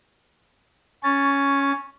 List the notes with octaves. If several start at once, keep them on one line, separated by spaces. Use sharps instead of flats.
C#4 C#6 A6